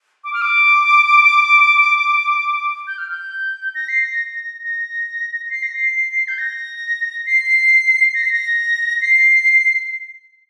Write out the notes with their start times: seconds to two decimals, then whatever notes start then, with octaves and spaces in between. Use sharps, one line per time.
0.24 D6
0.33 F6
0.42 D6
2.87 G6
2.98 F6
3.10 G6
3.75 A#6
3.89 C7
4.02 A#6
4.63 A#6
5.50 C7
5.63 A#6
5.76 C7
6.28 G6
6.38 A#6
7.26 C7
8.14 A#6
8.23 C7
8.32 A#6
9.01 C7